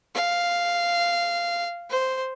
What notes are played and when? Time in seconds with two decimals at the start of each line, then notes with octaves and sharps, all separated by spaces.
0.15 F5
1.90 C5